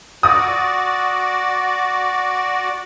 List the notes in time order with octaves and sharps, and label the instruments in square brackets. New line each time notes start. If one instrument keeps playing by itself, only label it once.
[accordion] F#4 D5 [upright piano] D#6